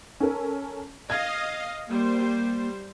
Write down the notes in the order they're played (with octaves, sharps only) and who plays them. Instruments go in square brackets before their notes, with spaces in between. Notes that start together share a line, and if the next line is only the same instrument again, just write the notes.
[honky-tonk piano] C#4 A4 A#4
[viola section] D#5 F5 [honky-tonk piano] G#6
[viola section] G3 C5 [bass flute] A#3